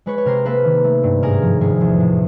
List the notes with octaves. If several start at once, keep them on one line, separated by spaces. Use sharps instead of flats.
G#3 B4 C#5
C#5
C3 A#4 C5
A#3 A4 B4
D#3
A3
G2
G#2 G#4 A#4
F3
F1 G#4
E2
A2